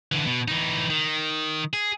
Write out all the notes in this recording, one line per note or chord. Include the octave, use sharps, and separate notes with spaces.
D3 E3
B2
E3 D#4
D#3
G#4